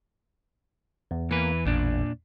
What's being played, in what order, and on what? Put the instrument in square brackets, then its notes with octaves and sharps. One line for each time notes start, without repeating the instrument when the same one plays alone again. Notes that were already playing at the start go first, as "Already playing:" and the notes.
[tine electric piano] E2
[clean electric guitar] E3 B4 [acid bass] A#3
[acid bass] A1 [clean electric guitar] A#2 D4